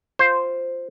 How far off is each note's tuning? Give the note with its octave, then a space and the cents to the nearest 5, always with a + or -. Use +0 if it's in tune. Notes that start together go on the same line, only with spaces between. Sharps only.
F4 +0 C5 +0